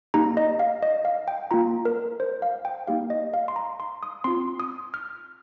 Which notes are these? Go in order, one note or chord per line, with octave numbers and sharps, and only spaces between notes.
A#3 D#4 G4 A#5
D#5
F5
D#5
F5
G5
A#3 F4 A#5
A#4
C5
F5
G5
A#3 D#4 G4 F5
D#5
F5
C6
A#5
C6
D#6
C4 F4 C6
D#6
F6